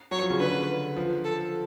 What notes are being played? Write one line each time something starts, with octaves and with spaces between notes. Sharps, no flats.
F#3 C#5
F3
C#3
D3 B4
F3
A4